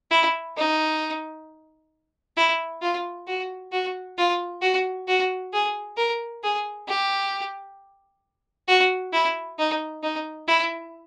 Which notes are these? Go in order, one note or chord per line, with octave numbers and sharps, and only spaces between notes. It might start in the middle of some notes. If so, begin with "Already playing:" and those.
E4
D#4
E4
F4
F#4
F#4
F4
F#4
F#4
G#4
A#4
G#4
G4
F#4
E4
D#4
D#4
E4